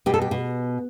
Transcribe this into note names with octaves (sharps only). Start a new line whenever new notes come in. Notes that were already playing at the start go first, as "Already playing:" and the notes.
B2 G4
A4
G4
B2